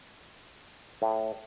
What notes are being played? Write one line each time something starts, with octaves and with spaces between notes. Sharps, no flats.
A2